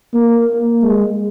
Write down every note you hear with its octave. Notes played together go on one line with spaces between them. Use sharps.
A#3
G#3